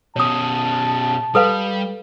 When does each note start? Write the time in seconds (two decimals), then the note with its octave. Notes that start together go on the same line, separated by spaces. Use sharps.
0.16 B2 C#4 C#5 A5 D#6
1.35 G3 A4 B4 F5